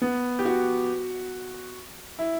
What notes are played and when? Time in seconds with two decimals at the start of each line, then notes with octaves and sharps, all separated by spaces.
0.02 B3
0.39 G4
0.45 F#4
2.19 E4